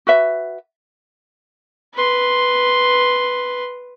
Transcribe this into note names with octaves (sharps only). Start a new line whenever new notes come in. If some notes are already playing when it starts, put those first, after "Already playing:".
F#4 B4 E5
B4 C6